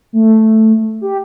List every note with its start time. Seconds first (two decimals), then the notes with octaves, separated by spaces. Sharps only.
0.13 A3
1.01 G4